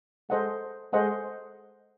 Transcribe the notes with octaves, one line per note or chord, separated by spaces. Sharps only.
G#3 A4 C5 D#5 F#5
G#3 A4 C5 D#5 F#5